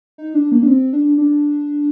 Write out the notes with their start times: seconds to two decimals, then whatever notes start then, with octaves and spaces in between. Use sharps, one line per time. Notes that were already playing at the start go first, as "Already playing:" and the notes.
0.18 D#4
0.34 D4
0.52 A#3
0.63 D4
0.68 C4
0.93 D4
1.18 D4